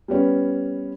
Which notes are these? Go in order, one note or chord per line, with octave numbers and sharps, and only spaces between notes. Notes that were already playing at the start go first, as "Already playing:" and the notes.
G3 B3 C#4